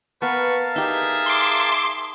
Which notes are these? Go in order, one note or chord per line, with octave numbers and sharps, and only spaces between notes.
B3 A#4 B4 F5 A5 C#6
D#4 G4 G#4 E5
C6 D6